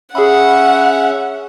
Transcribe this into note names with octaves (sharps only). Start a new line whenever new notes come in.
C#4 G#4 E5 F#5 B5